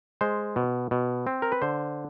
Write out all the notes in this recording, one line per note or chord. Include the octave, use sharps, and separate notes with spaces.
G#3 C5
B2
B2
C4
A#4
B4
D3 C5